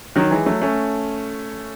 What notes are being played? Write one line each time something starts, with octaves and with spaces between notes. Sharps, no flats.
D#3 F#3
E3 G#3
F#3 A3
A3 C#4